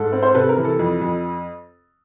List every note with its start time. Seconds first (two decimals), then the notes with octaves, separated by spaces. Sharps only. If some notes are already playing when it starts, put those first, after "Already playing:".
Already playing: G#2 A4
0.12 C4
0.23 C5
0.34 C3 A4 B4
0.49 A#4
0.57 E3
0.65 A4
0.79 F2
1.02 F2